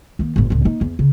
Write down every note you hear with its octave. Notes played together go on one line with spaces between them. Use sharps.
D#3 A#3
G1 A2
C#2 A2
A#3 D#4
E2
C#3